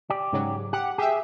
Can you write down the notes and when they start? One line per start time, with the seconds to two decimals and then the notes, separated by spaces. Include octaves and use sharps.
0.10 G4 D5
0.33 G#2 C#3 F#3
0.73 G4 F#5
0.98 G4 G#4 E5